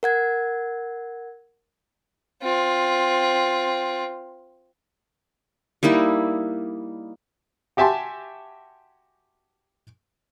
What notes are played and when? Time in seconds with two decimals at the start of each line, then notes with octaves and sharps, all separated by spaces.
0.03 A#4 F#5 G#6
2.42 C4 F4
5.83 G3 A#3 D#4 E4
7.77 F#4 G4 E5 G#5 A5 C6